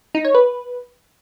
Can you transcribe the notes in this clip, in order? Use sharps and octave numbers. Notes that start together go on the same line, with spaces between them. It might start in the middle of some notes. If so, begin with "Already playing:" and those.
D#4
C#5
B4